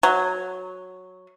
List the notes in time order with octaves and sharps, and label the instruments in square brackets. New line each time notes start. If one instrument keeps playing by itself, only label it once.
[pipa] F#3